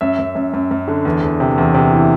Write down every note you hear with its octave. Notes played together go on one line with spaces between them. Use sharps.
F#2 E5
F#2
F#2
F#2
F#2
D3
E2
E2
C3
E2
C3
E3